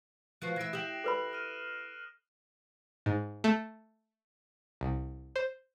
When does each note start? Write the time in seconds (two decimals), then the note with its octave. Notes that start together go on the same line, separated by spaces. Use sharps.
0.42 F3 F#4 B4 F#6 C7
0.56 E3 E5 F#6 A#6 D7
0.73 G4 E5 D#6 E7 F#7
1.04 A4 B4 B5
1.33 F6 D#7
3.06 G#2
3.44 A3
4.81 C2
5.36 C5